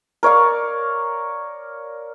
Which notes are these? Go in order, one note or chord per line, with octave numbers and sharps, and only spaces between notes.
A#4 C#5 D5 F5